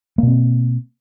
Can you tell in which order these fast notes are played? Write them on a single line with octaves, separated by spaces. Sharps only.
A#3 B2 C4